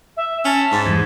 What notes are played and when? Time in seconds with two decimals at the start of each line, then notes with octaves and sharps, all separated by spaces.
0.17 E5
0.45 C#4 A5 B5
0.72 G#2
0.86 E2 G2 G#3